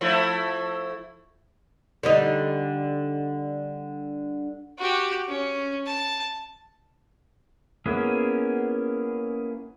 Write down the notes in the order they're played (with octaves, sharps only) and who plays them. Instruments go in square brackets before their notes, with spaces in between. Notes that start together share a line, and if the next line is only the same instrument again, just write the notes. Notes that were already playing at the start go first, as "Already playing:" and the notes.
[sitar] F3 A3 E4
[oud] D3 G3 D#4
[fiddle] F#4 G4
C#4
A5
[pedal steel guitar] A#3 B3 C#4 E4 G#4